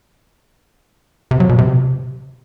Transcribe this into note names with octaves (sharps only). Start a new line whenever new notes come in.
C3
F#3
B2
C3